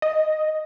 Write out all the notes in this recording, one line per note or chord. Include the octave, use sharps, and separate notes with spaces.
D#5